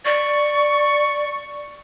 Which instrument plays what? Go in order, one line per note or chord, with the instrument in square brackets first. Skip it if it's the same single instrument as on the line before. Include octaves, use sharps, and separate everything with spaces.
[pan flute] D5 [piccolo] C#6